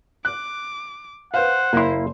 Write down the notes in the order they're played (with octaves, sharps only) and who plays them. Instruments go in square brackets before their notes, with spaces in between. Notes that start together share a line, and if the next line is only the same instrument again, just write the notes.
[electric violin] D6 [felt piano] F#6
[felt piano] B4 F5 [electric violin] C5 [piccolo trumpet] F#5
[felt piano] F#1 C6 [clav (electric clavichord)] A#3 E4